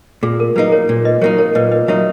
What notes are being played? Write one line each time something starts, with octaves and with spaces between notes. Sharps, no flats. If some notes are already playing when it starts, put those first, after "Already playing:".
A#2 G#4
A#4
F#3 A#3 D#4 B4
A#4 C#5
A#2
B4 D#5
F#3 A#3 D#4 A#4 C#5
A#4 C#5
A#2 B4 D#5
B4 D#5
F#3 A#3 D#4 C#5 E5